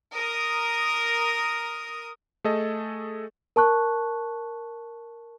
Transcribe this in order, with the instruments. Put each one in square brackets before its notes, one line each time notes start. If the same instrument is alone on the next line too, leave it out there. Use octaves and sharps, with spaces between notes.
[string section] A#4 D#6
[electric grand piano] A3 G#4 A4 D#5
[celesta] A#4 A5 C#6 F#6